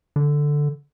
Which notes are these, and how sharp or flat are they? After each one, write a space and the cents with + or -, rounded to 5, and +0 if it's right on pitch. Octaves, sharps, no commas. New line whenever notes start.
D3 +0